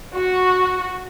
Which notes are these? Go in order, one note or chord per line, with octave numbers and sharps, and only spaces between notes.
F#4